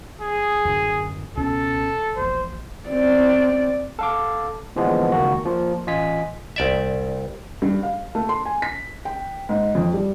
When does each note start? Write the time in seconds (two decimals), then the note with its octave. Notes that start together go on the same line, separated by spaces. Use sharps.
0.21 G#4
0.65 F#2 A2 D3
1.37 C#2 B2 C#4 A4
2.16 E1 A#1 C5
2.89 C4 D5
3.99 A4 F5 D6
4.76 A#2 D3 E3 F3 G#3 B3
5.12 C#2 D#3 A#3 F#4
5.45 F3 A#3 F4
5.87 A1 F4 D#5 G#5 B6
6.56 C2 D5 E5
7.62 G2
7.83 F5
8.15 A3
8.29 C6
8.46 G#5
8.62 B6
9.05 G5
9.49 G#2
9.75 F2
9.94 G3